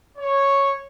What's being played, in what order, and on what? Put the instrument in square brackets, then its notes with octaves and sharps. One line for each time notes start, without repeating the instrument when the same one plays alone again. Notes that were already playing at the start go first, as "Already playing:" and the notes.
[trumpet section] C#5